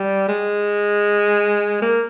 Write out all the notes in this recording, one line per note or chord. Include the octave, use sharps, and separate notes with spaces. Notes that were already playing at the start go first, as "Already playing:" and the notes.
Already playing: G3
G#3
A#3